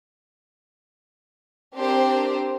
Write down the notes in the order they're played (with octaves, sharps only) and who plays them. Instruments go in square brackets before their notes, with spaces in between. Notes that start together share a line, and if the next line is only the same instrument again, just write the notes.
[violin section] C4 D4 G4 A#4 C5